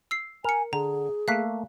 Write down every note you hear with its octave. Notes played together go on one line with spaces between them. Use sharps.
E6 C7
A#4 G#5 C#7 F7
D3 G#4 A#5
A3 A#3 F5 F#6 B6